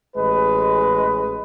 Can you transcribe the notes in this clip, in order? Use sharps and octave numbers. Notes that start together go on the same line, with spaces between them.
A1 G#3 B4